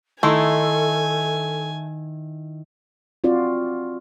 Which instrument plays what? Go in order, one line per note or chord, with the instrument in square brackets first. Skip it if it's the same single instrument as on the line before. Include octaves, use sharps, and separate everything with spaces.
[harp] D#3 E4 C6 [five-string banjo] A3 [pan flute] A4 [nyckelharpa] G#5
[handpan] C4 F4 F#4 D5